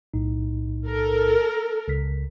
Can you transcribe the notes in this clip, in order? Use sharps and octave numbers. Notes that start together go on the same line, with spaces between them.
B1 A2 D#4
A4 A#4
C#2 C#3 B6